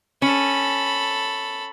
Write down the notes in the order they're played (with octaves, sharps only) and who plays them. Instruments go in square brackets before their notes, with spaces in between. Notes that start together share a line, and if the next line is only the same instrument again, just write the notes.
[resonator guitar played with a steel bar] C#4 [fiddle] A4 B5